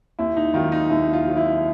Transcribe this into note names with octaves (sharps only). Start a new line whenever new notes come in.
D#2 E4
D#4
D#3 F#3 F4
D#4
D#2 E4
F4
D#3 F#3
E4